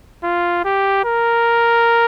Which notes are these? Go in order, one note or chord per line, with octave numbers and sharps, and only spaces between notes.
F4
G4
A#4